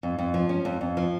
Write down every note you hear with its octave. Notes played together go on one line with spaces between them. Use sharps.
F2
F2
F3
C#4
F2
F2
F3